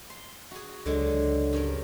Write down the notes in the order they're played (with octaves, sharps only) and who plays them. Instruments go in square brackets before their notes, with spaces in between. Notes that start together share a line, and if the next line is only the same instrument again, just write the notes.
[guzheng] C6
F#4 G#4
[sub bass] C#2 [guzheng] D3 F#3 G#3
[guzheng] G2 C#4 A#4